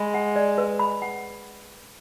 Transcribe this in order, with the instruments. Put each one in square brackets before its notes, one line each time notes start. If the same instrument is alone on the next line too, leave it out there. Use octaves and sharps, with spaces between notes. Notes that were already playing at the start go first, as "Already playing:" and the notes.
Already playing: [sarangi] G#3 [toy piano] B5
[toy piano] F#5
D5
B4
B5
F#5